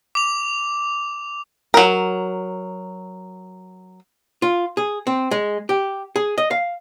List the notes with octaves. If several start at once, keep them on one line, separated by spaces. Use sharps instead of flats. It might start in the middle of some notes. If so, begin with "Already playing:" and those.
D6 F7
F#3 A#4
F4
G#4
C4
G#3
G4
G#4
D#5
F5